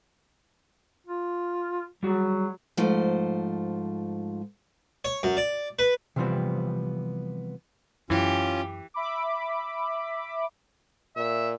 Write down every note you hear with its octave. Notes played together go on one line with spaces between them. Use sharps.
F4
F#3 G3 F#4 G#4
G#2 F3 A3 C5
C#5
F#2
D5
B4
C3 E3 F3 G3 B3 C4
F#2 E3 C#4 F4 G4
E5 B5 D6
A#2 E5